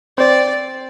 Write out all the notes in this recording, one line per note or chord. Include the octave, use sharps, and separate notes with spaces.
C4 C5 D5